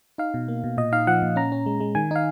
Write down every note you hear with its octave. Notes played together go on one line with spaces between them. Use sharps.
D#4 F5
B2
A#3
B2
A#2 D#5
D#4 F5
F3 F#5
A#2
C#4 A#5
C#4
G#3
G#3
D#3 G#5
D#4 F5